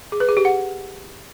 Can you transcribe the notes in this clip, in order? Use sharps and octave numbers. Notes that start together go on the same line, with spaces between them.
G#4
B4
G#4
G4
F#5